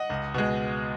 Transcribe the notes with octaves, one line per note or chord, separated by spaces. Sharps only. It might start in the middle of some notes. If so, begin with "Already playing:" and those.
Already playing: D#5 F#5
C#2
B2 G#3